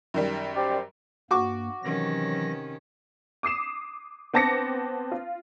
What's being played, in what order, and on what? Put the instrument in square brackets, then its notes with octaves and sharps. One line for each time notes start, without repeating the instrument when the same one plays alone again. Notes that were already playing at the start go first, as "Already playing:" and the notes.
[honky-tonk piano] F#2 D#3 G3
[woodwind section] G4 C5 D5
[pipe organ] G2 A#3 [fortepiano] F#4 C#6 D6
[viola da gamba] C3 D#3 C#4 [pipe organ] E3 F#3 A#6
[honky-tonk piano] D6 D#6 C7 E7
B3 C4 A5 D6 A#6 C#7
F4